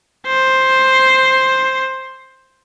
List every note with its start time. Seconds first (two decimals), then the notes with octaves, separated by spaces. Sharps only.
0.27 C5